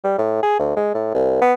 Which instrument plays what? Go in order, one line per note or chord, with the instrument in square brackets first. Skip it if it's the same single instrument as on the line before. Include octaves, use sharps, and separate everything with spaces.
[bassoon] G3
A2
G#4
D2
G#3
A2
C2
B3